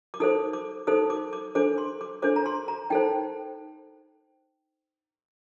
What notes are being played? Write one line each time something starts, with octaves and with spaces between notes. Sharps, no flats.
D6
D#4 A4 C5 D#6
D6
D#4 A4 C5 D#6
D6
D6
D4 A4 C5 D6
C6
D6
D4 A4 C5 D6
A#5
C6
A#5
D#4 A4 C5 G5